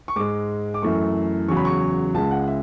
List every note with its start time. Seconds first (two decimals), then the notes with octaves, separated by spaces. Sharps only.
0.08 C#6
0.16 G#2 G#3 D6
0.74 D6
0.82 F#2 E3 A3 C#6
1.48 E2 C#3 F#3 C#6
1.57 B5
1.65 C#6
2.14 C#2 C#3 G#3 A5
2.31 F#5
2.48 E5